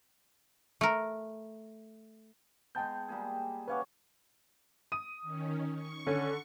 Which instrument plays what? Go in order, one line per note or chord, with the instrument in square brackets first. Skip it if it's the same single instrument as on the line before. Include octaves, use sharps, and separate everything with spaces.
[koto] A3 A#4
[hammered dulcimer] G#3 B3 [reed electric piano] G5 A5 G6
[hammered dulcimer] G3 A#3 G#4
[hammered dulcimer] C#4 C#5 D6 [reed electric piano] B4 F5 F#5
[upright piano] D#6 D#7
[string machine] D#3 C#4
C#6
[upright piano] D3 [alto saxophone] C#4